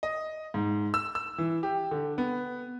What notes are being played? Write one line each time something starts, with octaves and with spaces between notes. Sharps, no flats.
D#5
G#2
E6
E6
E3
G4
D3
B3